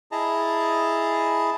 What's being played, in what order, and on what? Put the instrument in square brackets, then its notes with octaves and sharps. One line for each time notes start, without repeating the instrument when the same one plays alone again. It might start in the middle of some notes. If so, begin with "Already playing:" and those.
[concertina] E4 G#4 D#5 A5 A#5